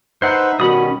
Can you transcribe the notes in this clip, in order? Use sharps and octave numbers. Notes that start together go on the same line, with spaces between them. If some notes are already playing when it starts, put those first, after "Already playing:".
D#4 B4 C5 E5 F#5
B2 D#3 G3 C#4 F#4 B5 D#6